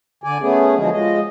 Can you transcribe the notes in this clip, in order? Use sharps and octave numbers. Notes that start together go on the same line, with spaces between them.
D3 D5 G#5
A3 B3 C#4 G#4
D3 F3 F#3 G#3 G#4
F3 G#3 D#5